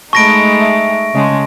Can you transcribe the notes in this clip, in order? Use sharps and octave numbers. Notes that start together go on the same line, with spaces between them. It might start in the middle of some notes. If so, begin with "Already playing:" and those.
G#3 A3 D#4 A5 B5 C#6 A#6 D7
E5
C#3 G#3 D#5 A5 C6